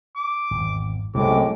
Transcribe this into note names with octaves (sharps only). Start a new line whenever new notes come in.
D6
G#1 E2
C2 F#2 A2 C3 G#3 D6